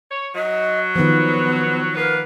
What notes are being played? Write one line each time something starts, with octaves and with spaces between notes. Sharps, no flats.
C#5
F#3 D#5
D#3 F3 B3
A#3 B3 A#4 B4